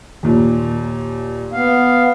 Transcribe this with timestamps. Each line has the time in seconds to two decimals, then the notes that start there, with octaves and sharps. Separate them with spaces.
0.23 D#2 A#2
1.53 B3 F5